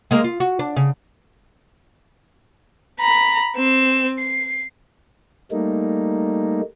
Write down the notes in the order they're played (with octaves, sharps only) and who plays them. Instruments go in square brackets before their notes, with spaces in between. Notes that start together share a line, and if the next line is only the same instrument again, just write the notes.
[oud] G#3 A#3 A#4
F4
F#4
D4
C#3
[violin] A#5 B5
C4 E7
C7
[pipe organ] G3 A3 A#3 D#4